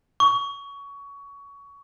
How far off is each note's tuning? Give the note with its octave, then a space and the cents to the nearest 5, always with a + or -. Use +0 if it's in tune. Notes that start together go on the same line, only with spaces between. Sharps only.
C#6 +20